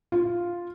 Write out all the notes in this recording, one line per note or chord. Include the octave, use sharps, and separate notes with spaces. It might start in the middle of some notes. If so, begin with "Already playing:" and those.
F4